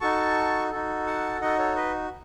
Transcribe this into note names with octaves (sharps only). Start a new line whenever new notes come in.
D#4 F#4 A4 A5 C#6
D#4 F#4 A4
F#5 A5
D#4 F#4 A4 D#5 F#5
A4 C#5
B4 D#5